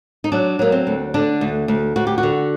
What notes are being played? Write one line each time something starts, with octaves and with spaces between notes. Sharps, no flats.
D#4
F#3 D4
F#3 A#3
C4
D2
D3 D4
D2
D2
D2 F#4
G4
F#4
D3